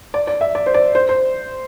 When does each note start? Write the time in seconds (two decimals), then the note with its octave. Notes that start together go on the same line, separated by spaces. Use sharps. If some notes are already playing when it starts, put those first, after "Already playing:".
0.14 D5
0.27 D5
0.41 E5
0.55 D5
0.66 C5
0.74 D5
0.95 C5
1.09 C5